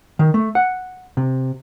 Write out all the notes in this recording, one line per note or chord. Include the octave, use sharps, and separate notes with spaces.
D#3
A3
F#5
C3